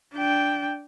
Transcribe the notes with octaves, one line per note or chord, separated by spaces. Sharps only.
D4 G5